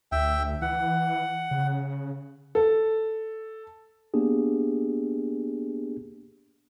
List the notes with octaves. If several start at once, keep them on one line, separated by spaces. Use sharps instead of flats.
D2 E5 G5
E3 F#5
C#3
A4
A#3 B3 D4 G4 G#4